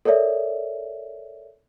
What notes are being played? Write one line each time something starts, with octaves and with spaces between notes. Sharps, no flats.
A4 A#4 C#5 D5 E5